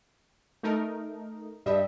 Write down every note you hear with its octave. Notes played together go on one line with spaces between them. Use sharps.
A3 D#4 A#4
G2 G3 D#5 E5